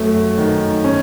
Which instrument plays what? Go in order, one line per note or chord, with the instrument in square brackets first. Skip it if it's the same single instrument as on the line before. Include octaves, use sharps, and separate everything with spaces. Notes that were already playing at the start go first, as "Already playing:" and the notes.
Already playing: [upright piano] F#2 A3
D#3
C#4